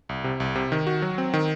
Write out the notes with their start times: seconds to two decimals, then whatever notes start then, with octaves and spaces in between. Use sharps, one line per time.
0.09 C2
0.24 C3
0.40 C2
0.55 C3
0.72 D#3
0.87 F#4
1.02 F#3
1.18 C4
1.34 D#3